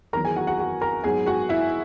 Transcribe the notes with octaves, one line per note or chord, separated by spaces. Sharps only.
E2 D#3 F#3 B3 A#4 A#5
G#4 G#5
F#4 F#5
F#4 F#5
F#4 F#5
A#4 A#5
G#2 F#3 B3 G#4 G#5
F#4 F#5
E4 E5